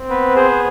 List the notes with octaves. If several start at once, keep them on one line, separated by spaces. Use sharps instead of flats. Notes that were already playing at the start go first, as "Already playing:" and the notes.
Already playing: C4
B3 B4
G#4 C5